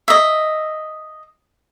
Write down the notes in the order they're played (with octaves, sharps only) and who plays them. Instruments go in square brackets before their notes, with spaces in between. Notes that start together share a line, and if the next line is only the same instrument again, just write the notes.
[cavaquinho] D#5 E5